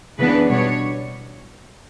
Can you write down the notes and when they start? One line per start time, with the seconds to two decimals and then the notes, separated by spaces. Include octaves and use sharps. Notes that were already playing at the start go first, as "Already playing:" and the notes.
0.18 C#3 E3 B3 D4 B4
0.49 B2 G3 B3 D4 C#5